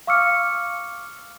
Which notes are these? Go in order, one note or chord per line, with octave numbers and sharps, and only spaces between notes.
F5 C#6 D6 E6 F6 C#7